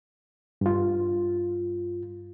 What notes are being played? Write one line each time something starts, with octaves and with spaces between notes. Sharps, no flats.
G2 F4